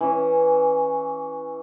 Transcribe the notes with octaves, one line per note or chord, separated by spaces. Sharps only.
E3 C#4